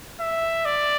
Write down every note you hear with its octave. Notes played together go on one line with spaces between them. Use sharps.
E5
D5